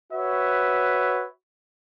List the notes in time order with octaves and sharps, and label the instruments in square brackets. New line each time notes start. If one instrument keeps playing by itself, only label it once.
[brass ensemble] F#4 B4 C#5 E5